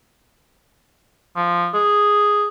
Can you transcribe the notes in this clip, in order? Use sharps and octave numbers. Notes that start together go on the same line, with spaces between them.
F3
G#4